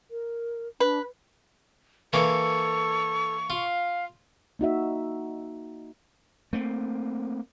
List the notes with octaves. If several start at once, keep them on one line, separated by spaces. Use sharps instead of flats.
A#4
D4 B4
E3 A#3 A4 C#6 D6
F4 F5
A#3 D#4 F#4 E5
A3 A#3 C4